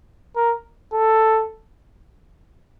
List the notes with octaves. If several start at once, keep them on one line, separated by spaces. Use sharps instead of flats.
A#4
A4